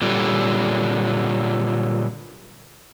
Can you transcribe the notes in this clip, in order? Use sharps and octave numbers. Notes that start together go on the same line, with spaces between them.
A#2 D3 F#3 G3